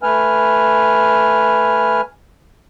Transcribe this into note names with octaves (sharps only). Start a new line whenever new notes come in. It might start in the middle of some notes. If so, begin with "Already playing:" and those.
A3 B4 G#5 F6